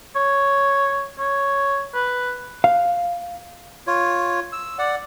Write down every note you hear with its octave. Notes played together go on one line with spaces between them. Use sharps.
C#5
C#5
B4
F5
F4 C#5
E6
D5 F#5